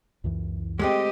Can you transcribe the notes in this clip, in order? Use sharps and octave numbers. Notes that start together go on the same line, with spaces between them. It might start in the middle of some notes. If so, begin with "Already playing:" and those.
C#2 F#2 E3
G#3 A3 C4 G4 D#5